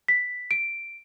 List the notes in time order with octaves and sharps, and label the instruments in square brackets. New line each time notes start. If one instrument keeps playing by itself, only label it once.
[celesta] B6
D7